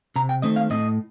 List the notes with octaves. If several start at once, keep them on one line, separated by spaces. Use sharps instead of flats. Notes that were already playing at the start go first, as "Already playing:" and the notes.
C3 A#5
G5
D#3 A3 C4 D#5
F5
A2 D#5